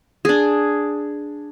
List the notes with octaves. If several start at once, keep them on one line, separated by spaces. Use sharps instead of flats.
D4 G#4